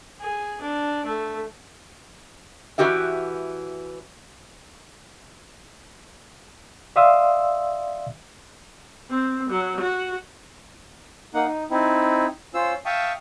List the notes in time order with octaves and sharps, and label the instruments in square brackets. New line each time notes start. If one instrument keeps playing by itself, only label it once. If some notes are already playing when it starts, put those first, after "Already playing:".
[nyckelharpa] G#4
D4
A3
[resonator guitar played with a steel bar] E3 C#4 F#4 G4 E5
[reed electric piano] D5 E5 F5 C6 D#6 E6
[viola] C4
F#3
F#4
[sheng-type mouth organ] A#3 D#4 F#5
D#4
C4 D#4 E4
C#4 F4 C5 E6
E5 F5 G5 A5 C#6 D#6